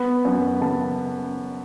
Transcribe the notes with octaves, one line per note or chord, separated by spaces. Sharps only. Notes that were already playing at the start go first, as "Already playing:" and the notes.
Already playing: B3 B5
F#2
C#3 A5